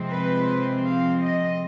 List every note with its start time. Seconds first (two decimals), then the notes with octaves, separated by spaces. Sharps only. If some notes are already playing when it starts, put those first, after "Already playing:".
Already playing: C3 F3 G#3 C4
0.09 B4
0.86 F5
1.24 D#5